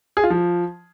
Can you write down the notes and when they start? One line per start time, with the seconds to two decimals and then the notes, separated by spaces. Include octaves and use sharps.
0.17 G#4
0.24 F4
0.30 F3